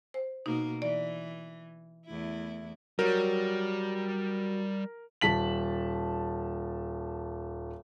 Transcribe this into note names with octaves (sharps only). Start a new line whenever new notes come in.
C5
B2 A#3 D#4
E3 D5
E2 A3 E4
F#3 G3 F#4 A#4
D#1 A5 B6 F#7